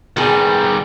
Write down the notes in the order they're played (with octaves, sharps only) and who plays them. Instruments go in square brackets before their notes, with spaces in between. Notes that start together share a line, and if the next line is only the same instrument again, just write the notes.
[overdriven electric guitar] D#3 G3 [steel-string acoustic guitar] B3 G#4